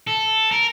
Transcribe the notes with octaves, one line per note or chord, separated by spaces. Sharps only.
A4
A#4